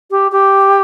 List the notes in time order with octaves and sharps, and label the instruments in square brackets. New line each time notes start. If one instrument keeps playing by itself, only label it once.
[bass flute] G4
G4